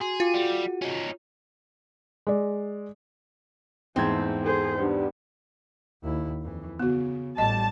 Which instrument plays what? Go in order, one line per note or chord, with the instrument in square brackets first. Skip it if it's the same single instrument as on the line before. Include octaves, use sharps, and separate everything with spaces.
[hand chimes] F#4 C6 [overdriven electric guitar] G#4
[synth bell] F4 [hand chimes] F5 G5 D6
[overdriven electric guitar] G3 [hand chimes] F#4 G#4 F#5
[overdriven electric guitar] C#4 D#4
[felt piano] G#3 D5
[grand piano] E2 G#2 G#6 [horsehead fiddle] A3 [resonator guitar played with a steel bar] C4
[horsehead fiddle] G#4 C5 [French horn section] A4
[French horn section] G3 D4 [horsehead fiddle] B3
[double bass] D#2 E4
F2 E3
[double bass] C#3 [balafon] B3 F#4
[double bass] A1 G3 [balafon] D#5 [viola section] A5